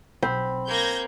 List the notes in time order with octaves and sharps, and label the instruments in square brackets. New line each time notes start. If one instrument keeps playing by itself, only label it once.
[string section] B1 [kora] C4 [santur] B5
[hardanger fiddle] A#3 [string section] G6 G#6 A#6